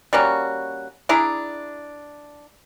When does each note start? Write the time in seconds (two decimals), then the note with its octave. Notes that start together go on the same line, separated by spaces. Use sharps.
0.13 G3 A#3 C#4 F#4
1.09 D4 E4 G#4 A#5